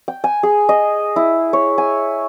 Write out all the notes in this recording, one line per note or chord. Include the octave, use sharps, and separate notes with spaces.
G5
G#5
G#4
D#5
E4
C#5
G#5